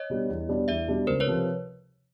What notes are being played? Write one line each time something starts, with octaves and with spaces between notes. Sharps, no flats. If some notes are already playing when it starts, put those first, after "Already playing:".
Already playing: C#5 D#5
B2 G3 B3 D4
E2
B2 G3 B3 D4
E2 D5 E5
B2 G3 B3 D4
C#2 A#4 C5
B4 C#5
C3 F3